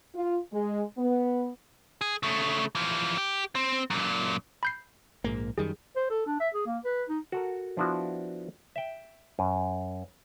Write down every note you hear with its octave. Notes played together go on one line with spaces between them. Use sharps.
F4
G#3
B3
G#4
C#3 A3
E3 F3
G4
C4
F#2 A#2
B5 G6 C7
A#1 G#2 A#3
F#2 D#3 G3 G#4
C5
A4
D4
E5
G#4
A#3
B4
D#4
F#4 A4 A#4
F3 B3 D4 E4 F#4
E5 G5
F#2